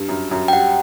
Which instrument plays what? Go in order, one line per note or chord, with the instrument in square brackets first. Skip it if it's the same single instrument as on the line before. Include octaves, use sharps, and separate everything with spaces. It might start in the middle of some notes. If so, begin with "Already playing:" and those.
Already playing: [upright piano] G2
F#2
F#2
[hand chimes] G5
[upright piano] G3 [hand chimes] F#5